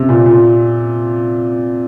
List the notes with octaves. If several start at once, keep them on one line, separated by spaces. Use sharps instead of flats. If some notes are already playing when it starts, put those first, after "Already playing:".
Already playing: C3
A#2
A#2